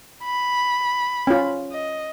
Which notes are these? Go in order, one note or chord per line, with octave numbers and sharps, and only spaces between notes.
B5
C#4 F4
D#5